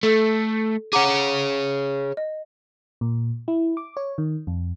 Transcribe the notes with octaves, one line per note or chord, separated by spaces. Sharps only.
A3 A4
G#4 C#5 F#5 A#5 D6
D#5
A#2
E4
D6
C#5
D#3
F2